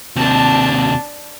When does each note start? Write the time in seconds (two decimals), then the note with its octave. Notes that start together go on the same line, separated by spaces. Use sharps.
0.16 D#2 C3 D4 A5